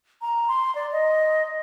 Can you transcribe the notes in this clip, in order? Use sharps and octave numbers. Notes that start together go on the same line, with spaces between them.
A#5
C6
D5
D#5